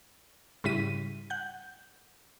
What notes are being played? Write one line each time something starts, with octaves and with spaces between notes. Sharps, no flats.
G#2 C#3 G3 E4 B6 D#7
F#5 G6